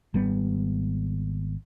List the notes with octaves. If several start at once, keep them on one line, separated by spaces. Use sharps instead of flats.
G#1 G3 B3